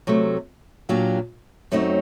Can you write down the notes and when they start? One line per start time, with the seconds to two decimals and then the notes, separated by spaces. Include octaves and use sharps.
0.07 C3 F#3 A3
0.89 A#2 F#3 A#3 D4 G4
1.72 F#2 F#3 A3 C4 D#4